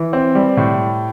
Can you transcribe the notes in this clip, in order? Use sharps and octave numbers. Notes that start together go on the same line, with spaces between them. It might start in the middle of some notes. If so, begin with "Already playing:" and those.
Already playing: E3
C4
G3
A2